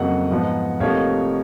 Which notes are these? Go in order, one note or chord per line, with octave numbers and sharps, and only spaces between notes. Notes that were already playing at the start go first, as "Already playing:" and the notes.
Already playing: F2 C#3 F#3 A#3 D#5 F#5
G#2 F3 B3 D#4
F1 F2 F3 A#3 D#4 C#5 F5